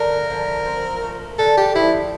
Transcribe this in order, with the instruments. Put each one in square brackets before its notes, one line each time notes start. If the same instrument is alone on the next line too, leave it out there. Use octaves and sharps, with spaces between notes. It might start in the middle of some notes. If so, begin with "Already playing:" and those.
Already playing: [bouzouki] D3 A3 [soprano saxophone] A#4
[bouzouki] F3
C4
A3
[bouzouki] D3 [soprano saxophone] A4
[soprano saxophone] G4
[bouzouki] F3 [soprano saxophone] E4